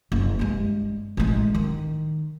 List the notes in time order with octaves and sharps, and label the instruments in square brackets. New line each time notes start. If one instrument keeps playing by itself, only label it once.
[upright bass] F#1
G2 G#3
A1 G#3
D#3